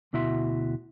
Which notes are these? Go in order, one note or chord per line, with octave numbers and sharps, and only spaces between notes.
D2 B2 E4 F#4 E5 C6